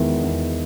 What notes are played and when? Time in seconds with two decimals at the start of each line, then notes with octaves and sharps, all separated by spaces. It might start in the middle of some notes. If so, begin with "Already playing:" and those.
Already playing: E2 D#3 G#3 B3 E4
0.23 E2